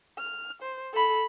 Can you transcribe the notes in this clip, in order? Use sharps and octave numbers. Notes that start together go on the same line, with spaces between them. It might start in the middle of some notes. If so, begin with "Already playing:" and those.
F6
C5
A4 B5